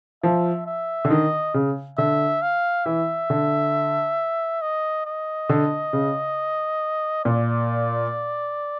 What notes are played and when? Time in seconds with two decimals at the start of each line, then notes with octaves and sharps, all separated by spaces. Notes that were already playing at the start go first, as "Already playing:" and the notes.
0.23 F3 E5
0.66 E5
1.05 D3
1.10 D#3 D#5
1.54 C#3
1.98 D3 E5
2.42 F5
2.85 E3 E5
3.30 D3
4.62 D#5
5.05 D#5
5.49 D3
5.93 C#3
7.24 A#2 D5